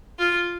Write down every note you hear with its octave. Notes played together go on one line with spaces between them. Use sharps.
F4